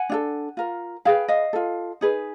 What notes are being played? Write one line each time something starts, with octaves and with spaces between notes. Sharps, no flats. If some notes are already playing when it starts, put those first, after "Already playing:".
Already playing: F#5 G#5
D4 F4 A4
F4 A#4
E4 G#4 B4 F5 G5
D#5 F5
F4 A4
D#4 G#4 B4